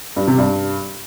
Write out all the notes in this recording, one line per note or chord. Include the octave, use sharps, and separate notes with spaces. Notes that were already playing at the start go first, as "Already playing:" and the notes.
G2
C3
G2